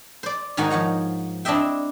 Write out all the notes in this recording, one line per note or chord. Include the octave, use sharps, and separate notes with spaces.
C5 D5
G#2 D#3 D#4 F#4 F#5 G#5
F3 C#5 F#5 A#5
C4 D4 E4 D#5 E5 G5